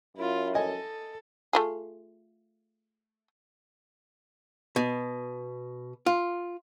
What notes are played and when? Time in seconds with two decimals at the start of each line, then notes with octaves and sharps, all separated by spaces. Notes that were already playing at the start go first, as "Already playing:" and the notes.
0.17 F#2 E4 F4
0.55 A4 D#5 G#5
1.53 A3 F4 G#4
4.76 B2
6.06 F4